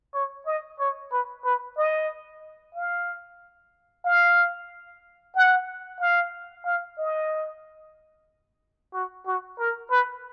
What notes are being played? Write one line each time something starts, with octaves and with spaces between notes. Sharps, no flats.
C#5
D#5
C#5
B4
B4
D#5
F5
F5
F#5
F5
F5
D#5
F#4
F#4
A#4
B4